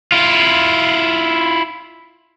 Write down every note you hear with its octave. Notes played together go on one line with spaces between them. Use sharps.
E4 F4